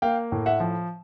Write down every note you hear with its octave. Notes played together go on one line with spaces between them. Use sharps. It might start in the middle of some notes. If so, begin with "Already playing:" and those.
A#3 F5 G5
A2
E5 F#5
F3